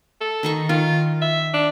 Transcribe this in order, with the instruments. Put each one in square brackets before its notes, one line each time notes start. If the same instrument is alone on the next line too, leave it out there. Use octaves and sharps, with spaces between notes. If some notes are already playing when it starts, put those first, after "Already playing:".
[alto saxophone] A4
[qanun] D#3 D#4 C#6
[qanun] D#3 [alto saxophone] F4
[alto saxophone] E5
D4